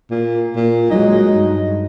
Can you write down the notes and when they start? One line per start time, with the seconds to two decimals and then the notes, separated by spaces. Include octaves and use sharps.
0.11 A#2
0.56 A#2
0.90 F#3 G#3 D#4
1.29 G2